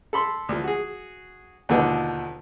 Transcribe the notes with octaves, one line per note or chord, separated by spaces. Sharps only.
A4 B5 C6
D2 F3
F#4 G#4
D#2 B2 D3 F3 B3 D#4